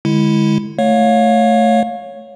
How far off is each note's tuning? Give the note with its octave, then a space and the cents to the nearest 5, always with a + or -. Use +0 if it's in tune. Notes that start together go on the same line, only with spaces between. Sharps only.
D3 +25 G#3 +0 E4 +0
A3 +0 C#5 +0 F5 +25